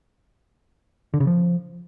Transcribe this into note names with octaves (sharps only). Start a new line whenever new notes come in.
D3
C#3
F3